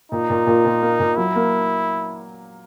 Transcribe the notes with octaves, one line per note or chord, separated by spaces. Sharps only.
A#2 D#4
A#2
A#2
A#2
A#3
A#2
F#3 E4
A#3